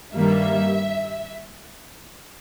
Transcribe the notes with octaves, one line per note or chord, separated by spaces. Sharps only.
G2 D#3 G3 A#3 E5